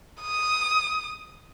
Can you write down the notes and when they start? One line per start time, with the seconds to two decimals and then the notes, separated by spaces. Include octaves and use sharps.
0.22 D#6